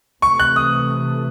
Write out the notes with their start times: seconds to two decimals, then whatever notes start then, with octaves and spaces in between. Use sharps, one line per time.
0.22 C3 E3 A3 C#6
0.40 F#6
0.56 D#6